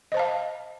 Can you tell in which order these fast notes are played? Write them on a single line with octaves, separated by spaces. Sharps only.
D#5 C5 A5 F5